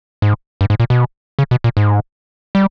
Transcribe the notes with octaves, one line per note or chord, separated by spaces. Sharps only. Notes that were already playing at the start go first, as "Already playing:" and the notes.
G#2
G2
G#2
A#2
B2
C#3
B2
A#2
G#2
G3